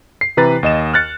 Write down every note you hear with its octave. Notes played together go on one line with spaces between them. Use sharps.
C7
C3 E3 B4 A#5 A6
D#2 D#5 E7
F6 F#6 A6 C#7